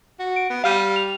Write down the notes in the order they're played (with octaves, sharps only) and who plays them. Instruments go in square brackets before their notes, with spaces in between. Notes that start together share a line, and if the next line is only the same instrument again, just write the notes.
[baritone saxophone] F#4
[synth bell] D7
[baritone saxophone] B3
[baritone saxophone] G3 [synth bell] F5 F6 D#7
[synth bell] F7